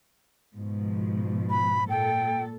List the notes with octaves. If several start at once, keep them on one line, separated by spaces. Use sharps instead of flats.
G#2 B2 F3
B5
A#2 A4 G5